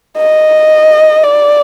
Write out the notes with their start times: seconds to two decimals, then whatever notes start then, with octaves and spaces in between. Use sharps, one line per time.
0.17 D#5
1.24 D5